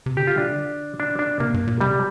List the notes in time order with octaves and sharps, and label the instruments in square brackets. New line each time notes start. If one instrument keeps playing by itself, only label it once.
[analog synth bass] C3
[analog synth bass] D3 [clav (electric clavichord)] G4
[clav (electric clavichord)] F4
D4
D4
D4
[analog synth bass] C3 [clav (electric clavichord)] A#3
[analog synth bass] G2
A#2
[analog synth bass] C3 [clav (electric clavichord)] G3